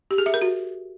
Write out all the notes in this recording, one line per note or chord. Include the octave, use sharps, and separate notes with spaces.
G4
G#4
E5
A#4
F#4